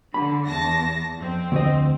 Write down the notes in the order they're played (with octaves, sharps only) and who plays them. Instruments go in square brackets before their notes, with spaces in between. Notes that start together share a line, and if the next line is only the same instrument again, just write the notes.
[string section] D3 [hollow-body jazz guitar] B5
[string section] E2 A5 A#6
F2 C4
[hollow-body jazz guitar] D2 D#5